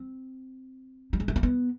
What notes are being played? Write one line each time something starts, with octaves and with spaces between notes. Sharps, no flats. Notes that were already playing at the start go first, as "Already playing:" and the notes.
Already playing: C4
G3
G#3
A3
A#3
B3